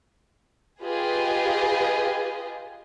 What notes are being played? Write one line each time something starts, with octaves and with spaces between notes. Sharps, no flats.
F4 G4 G#4 B4 D#5